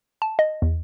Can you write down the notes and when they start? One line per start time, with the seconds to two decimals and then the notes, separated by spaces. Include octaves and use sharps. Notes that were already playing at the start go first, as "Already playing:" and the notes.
0.22 A5
0.39 D#5
0.62 E2